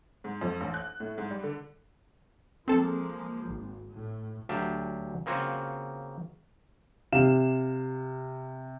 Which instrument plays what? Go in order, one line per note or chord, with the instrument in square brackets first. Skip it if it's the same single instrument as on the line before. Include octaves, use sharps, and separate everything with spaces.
[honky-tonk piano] G#2
F2
A1
F#6
A2
G#2
G3
D3
[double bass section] F3 G#3 A#3 [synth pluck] C4 A4
[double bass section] G#1
A2
[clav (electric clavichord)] D2 F#3 G4 F5 A5
C#3 A#3 C4 F4 F#4
[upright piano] C3 F5 E7